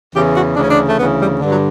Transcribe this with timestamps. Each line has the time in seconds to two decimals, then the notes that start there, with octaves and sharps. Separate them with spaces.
0.15 E2 C#3 E3 G4
0.36 F#4
0.57 D2 C#3 E3 D4
0.64 C#4
0.71 D4
0.88 A3
0.98 D2 C#3 E3 B3
1.20 G3
1.40 G2 D3
1.51 F#3